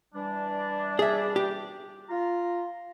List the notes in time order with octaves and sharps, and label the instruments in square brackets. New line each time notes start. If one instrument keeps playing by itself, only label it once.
[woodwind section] E3 G3 D4
[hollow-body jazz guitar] G#4 E5
G4
[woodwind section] F4 A#5